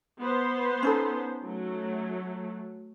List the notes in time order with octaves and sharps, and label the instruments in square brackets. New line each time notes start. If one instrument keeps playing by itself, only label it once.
[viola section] B3 C5
[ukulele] C#4 D#4 A4
[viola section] F#3 A3